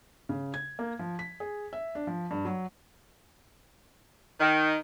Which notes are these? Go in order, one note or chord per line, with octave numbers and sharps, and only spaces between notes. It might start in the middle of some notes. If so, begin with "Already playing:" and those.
C#3
G#6
A#3
F3
B6
G#4
E5
D4
F3
G2
F#3
D#3